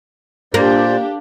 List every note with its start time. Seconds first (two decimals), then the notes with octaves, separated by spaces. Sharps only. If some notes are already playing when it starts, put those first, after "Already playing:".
0.54 A#2 A#3 D4 G4 C5 D5